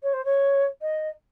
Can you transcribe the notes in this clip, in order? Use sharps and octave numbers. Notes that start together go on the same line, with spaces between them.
C#5
C5
C#5
D#5